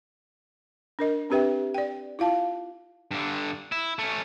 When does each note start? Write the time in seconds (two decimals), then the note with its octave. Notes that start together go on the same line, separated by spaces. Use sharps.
0.99 D4 A#4 D#5
1.30 C4 D4 G4 B4 E5 G5
1.74 D5 G5
2.19 E4 F4 F5 A5
3.11 G2 D3
3.72 E4
3.99 A3 C#4